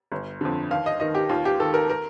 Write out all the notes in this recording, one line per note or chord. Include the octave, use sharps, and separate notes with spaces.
G1
F2 D3
D#2 F5
D#5
D#3 D#5
G4
D#2 F4
G4
D#3 A4
A#4
A#4